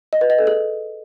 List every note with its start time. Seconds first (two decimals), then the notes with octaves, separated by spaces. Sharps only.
0.13 D#5
0.21 B4
0.30 D#5
0.38 A4
0.47 G#4